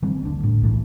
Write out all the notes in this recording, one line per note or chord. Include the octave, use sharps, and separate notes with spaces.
D#3 G3 C4
D2 D3
A2
C2 A2 E3